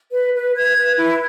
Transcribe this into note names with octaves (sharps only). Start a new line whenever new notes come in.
B4
B4
B4 G#6
B4
E4